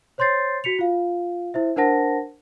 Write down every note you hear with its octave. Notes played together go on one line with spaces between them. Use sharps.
C5 C#5 C6 G6 A6 C7
F#4 B6 C#7 F7
F4 F5
E4 C5 E5
D4 A#4 C5 F#5 A5 A#6